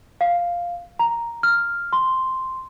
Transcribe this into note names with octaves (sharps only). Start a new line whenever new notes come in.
F5
A#5
F6
C6